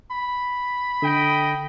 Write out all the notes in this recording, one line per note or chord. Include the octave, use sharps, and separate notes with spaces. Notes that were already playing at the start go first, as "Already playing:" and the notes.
B5
D3 D#5 G5